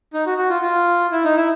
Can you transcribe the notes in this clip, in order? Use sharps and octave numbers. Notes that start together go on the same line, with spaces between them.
D#4
F#4
F#4
F4
F4
E4
D#4
E4